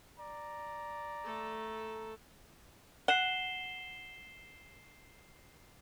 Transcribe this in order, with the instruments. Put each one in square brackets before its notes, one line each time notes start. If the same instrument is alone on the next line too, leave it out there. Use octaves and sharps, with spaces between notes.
[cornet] D5 [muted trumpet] A#5
[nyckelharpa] A3 A4
[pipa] F#5 [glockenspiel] C7 E7 G7